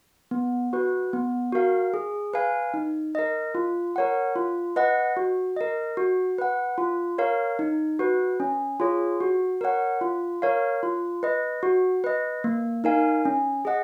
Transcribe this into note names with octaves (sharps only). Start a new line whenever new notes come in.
B3
F#4 B4
B3
F#4 A#4 F5
G#4
B4 F5 G#5
D#4
A#4 D#5
F4
A#4 C#5 F#5
F4
B4 D#5 F#5
F#4
A#4 D#5
F#4
B4 F#5
F4
A#4 C#5 F5
D#4
F#4 B4
C#4
F4 G#4 C#5
F#4
A#4 C#5 F#5
F4
A#4 C#5 F5
F4
B4 D#5
F#4
B4 D#5
A#3
D#4 A#4 F5 G#5
C#4
G#4 D#5 F#5